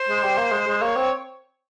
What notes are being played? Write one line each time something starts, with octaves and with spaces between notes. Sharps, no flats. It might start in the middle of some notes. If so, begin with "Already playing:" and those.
Already playing: C5
G#3
G3
A#3
G#3
G#3
A#3 C#5
C4